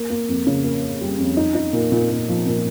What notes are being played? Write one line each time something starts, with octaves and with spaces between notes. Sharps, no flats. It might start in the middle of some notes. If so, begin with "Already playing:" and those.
Already playing: A#3
A#3
F2
C#3
A#3
A#3
G3
F2
D#4
D#4
A#2
A#2
A#2
F3
A#2